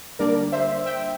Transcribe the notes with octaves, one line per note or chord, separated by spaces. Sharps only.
D3 G3 A#3 D4 A#4 D5
C5 E5
E5 G5